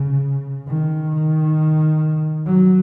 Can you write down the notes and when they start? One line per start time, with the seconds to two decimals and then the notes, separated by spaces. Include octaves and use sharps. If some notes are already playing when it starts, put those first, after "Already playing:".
Already playing: C#3
0.68 D#3
2.46 F#3